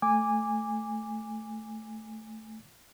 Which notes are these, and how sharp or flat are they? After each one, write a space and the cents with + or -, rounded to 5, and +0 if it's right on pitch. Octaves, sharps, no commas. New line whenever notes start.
A3 +0 G#5 -15 D6 +0